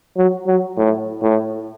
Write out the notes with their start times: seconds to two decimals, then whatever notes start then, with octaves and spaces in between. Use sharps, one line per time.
0.17 F#3
0.47 F#3
0.77 A2
1.22 A2